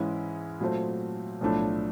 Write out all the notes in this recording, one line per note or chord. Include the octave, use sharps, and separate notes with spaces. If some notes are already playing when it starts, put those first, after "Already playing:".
Already playing: G#2 E3 G#3 C#4 E4
A#2 F#3 A3 C4
B1 A2 F3 A3 D4